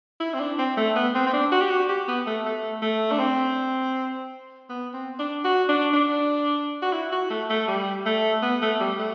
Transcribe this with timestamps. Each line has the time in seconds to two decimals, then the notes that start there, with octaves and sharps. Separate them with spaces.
0.20 E4
0.33 C4
0.40 D4
0.59 C4
0.77 A3
0.96 B3
1.15 C4
1.26 C4
1.33 D4
1.52 F#4
1.61 G4
1.70 F#4
1.89 G4
2.08 B3
2.26 A3
2.46 A3
2.82 A3
3.12 D4
3.19 C4
4.69 B3
4.94 C4
5.19 D4
5.45 F#4
5.69 D4
5.93 D4
6.82 F#4
6.93 E4
7.12 F#4
7.30 A3
7.50 A3
7.68 G3
8.06 A3
8.42 B3
8.62 A3
8.80 G3
8.99 A3